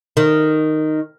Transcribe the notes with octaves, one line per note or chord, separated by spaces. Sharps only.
D#3